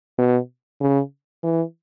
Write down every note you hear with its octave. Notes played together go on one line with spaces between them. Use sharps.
B2
C#3
E3